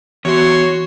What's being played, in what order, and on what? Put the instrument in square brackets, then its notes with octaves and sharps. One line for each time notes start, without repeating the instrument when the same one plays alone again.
[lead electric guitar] E2 [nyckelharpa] F#4 [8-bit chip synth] C#5 C6